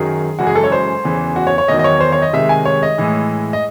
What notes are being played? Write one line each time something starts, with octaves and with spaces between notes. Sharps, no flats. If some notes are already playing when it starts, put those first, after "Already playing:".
Already playing: F#2 D#3 F#3 G#4
F#2 C#3 E3 G#3 F#4
G#4
A4
C#5
C5
E2 C#3 E3
F#4
C#5
C#5
E2 D#3 F#3 D#5
D#5
C#5
C5
C#5
D#5
C3 D#3 G#3 E5
G#5
C#5
D#5
A2 E3 G#3
D#5